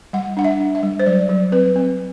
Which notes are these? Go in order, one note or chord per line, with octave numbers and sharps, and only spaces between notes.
G3 F#5
D4 F#5
E5
D4
E5
G3
C5
F#3 D5
F#3
C4 B4
C4